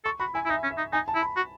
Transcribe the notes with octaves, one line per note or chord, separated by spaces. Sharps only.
A4 C#6
F#4 B5
E4 G#5
E4
D#4 E5
C#4
E5
D#4
D#4 G#5
A5
E4
B5
F#4